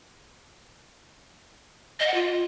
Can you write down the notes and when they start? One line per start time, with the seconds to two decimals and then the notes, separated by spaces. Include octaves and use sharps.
2.00 D#5
2.07 F#5
2.14 F4